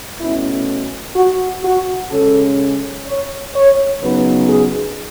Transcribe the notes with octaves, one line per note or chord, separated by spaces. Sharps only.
B2 A3 C#4 E4
F#4
F#4
C#3 G#3 C#4 A4
C#5
C#5
C#3 F#3 B3 D#4 B4
G#4